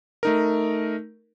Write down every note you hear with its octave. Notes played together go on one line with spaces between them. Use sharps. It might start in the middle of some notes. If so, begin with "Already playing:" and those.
A3 D#4 A#4